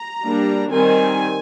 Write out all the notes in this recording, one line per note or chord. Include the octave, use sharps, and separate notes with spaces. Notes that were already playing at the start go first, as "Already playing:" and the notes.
Already playing: A#5
G3 A#3 D4
D#3 G3 C4 G#5